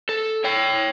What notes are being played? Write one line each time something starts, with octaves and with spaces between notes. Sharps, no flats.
A4
C#5 G5